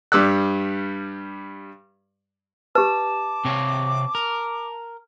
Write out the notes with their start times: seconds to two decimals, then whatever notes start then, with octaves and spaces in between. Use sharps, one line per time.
0.12 G2 G3 D6 E6 F#6
2.75 G4 B4 A5 D6
3.45 C3 C4 C#5
4.15 A#4